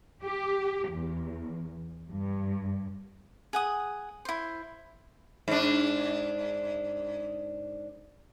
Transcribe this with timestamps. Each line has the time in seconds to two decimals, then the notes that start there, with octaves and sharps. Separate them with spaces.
0.23 G4
0.91 E2
2.11 G2
3.53 G#4 F#5 D#6
4.25 E4 C5
5.48 G#2 D4